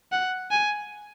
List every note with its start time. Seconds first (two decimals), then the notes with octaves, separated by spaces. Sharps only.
0.12 F#5
0.51 G#5